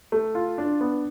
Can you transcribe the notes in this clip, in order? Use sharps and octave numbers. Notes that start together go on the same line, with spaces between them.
A3
F4
D4
B3